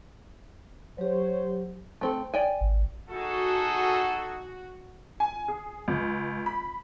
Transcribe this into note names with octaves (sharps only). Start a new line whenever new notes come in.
F#3 G4 C5 C#5
A3 C4 A4
D5 G5 G#5
G#1
D#4 F#4 G#4 A4
G#5
G#4
C#2
B5